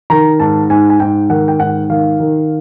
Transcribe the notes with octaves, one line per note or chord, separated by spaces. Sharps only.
D#3 A#5
G#2 A5
G#2 G#5
G#5
G#2 G5
D#3 F#5
G5
G#2 F#5
D#3 F5
D#3